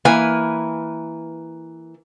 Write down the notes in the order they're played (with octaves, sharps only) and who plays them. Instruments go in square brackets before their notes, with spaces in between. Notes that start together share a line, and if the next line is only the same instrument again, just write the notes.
[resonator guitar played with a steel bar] E3 A#3 B4 G#5